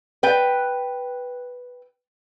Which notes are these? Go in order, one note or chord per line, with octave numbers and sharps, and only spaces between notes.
B4 G5